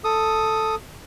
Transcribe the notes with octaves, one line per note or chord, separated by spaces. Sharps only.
A4 D#6